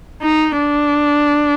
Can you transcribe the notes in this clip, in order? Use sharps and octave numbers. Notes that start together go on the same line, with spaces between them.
D#4
D4